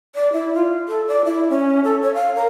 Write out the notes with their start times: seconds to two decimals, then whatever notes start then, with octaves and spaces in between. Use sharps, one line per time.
0.15 D5
0.33 E4
0.54 F4
0.88 A4
1.08 D5
1.25 E4
1.50 C#4
1.84 A4
2.02 C#5
2.14 F5
2.36 A#4